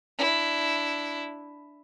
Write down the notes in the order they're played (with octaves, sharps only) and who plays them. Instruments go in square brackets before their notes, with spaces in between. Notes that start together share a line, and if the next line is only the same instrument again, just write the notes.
[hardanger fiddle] D4 E4